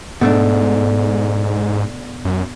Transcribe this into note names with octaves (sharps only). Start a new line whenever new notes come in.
G#2 B2 A3 D4
F#2